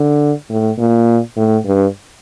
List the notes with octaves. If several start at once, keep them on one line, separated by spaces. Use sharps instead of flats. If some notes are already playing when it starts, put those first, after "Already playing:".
Already playing: D3
A2
A#2
A2
G2